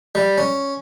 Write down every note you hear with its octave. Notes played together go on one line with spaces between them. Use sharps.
G3
C#4